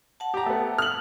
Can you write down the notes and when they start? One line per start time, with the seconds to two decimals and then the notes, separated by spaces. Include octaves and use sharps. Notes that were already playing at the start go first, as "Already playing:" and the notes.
0.20 F#5 A5
0.34 G4 A#5
0.46 A3 B3
0.78 F6 F#7